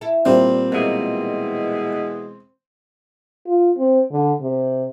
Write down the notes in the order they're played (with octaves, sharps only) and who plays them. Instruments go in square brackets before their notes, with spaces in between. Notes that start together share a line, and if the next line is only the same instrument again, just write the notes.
[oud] E4 A4
[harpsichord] A#2 G3 [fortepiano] C4
[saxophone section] B2 E3 G#3 [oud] A#3 F4
[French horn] F4
C4
D3
C3